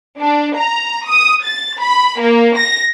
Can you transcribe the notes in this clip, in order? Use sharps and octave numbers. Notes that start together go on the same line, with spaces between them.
D4
A#5
D#6
A6
B5
A#3
A#6